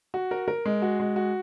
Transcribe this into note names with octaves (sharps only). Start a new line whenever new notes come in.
F#4
A#4
A#4
G#3
F#4
G#3
F#4